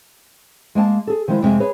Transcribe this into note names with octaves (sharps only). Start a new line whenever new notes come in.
G#3 A#3 G#5 A5
G#4 A4
D#3 F3 G#3 E4
F2 C3 G#3 E5 G#5
G#4 B4 C#5